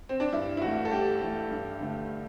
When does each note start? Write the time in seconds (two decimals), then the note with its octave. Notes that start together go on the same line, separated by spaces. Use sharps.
0.09 C4
0.20 D4
0.33 G2 E4
0.57 E4
0.62 E3 A3 F#4
0.85 A4
0.91 G2 G4
1.22 E3 A3
1.51 G2
1.80 D3 A3